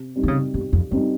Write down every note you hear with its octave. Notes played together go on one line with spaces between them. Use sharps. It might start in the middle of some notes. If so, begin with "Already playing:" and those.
Already playing: C3
G3 C4 D#4
D#3
C#3
G2 C3
F2
F2 G3 C4 D#4